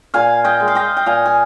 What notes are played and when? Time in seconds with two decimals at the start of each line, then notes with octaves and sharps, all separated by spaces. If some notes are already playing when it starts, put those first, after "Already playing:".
0.14 A#2 F5 G#5
0.44 D#5 G5
0.60 G#3
0.68 F5
0.75 D#5 G5
0.97 G5
1.06 A#2 F5 G#5
1.26 G#5